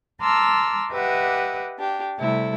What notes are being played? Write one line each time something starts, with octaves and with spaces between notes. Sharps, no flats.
A5 A#5 C6 D6 E6 F6
G4 B4 D#5 E5 F#5 D6
D4 G4
C3 G3 A3 E4 A4